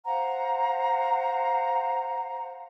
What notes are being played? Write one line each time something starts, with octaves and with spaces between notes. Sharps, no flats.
C5 F5 F#5 A#5